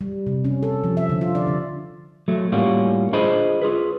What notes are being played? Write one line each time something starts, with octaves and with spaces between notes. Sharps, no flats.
G3
C3
C#4
A4
F3
E5
D3
F4
D5
D3
F#3 A3
A2 G3 A#3 C#4 F4 F#4
D4 F4 G#4 C5 D#5 B5
F4 G#4 B4